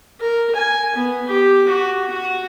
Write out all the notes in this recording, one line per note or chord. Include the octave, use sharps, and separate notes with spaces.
A#4
G#5
B3
G4
F#4
F#4